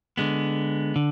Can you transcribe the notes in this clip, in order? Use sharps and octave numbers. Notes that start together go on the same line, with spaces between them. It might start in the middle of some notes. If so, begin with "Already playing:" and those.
D3 G#3 B3
D3